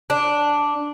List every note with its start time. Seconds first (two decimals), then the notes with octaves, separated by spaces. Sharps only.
0.10 D4